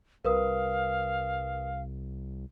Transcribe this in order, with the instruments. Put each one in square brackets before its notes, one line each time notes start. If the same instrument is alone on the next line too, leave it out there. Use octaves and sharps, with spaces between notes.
[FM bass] C2 [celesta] A#4 B4 D#6 [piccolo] F5